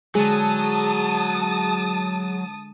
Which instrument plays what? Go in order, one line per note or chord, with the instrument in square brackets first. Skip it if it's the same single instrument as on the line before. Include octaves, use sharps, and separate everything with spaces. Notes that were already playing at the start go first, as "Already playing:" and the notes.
[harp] D3 G#3 [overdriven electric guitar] F#3 [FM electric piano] G#4 [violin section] A5 D#6